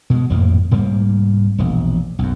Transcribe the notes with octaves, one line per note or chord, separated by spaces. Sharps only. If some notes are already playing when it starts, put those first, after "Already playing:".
B2 G#3
G#1 F2 A2 A#3
C2 G#2 G3 A#3
E1 A#1
B1 F#2